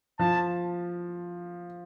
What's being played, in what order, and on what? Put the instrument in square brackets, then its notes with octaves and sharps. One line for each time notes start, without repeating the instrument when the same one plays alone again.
[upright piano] F3 [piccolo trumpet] A5